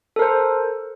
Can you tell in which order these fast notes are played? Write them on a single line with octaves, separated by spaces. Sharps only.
A4 A#4 C5